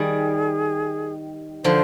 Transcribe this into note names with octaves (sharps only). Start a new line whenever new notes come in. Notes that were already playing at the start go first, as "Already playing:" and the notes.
Already playing: D#3 G3 G#4
D3 F3 C5